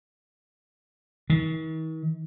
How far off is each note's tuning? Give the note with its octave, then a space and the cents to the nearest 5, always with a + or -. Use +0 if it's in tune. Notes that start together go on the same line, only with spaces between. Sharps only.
D#3 +45